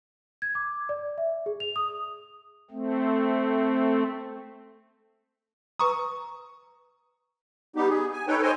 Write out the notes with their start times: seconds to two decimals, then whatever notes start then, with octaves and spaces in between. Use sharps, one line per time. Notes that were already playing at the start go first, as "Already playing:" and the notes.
0.42 G#6
0.55 D6
0.89 D5
1.18 E5
1.46 G#4
1.60 F7
1.76 D#6
2.71 A3 C4
5.79 B4 A#5 C#6 D#6
7.76 G3 B3 D#4 G4
7.89 G#4
8.13 G#5
8.28 D#4 A4 B4 C#5 G5
8.42 C5 C#5 D#5 G5 G#5